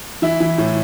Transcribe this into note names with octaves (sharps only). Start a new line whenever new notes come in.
E3 E4
E3
A2